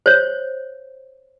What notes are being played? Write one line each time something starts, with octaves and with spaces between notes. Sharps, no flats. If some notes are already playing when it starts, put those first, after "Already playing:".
C5 C#5